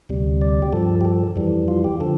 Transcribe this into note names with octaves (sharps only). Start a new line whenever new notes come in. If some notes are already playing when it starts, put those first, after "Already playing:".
D2 C3 G3
D5
G4
G2 F3 A4
G4
A4
F2 E3 G3
F4
G4
D3 F3 A4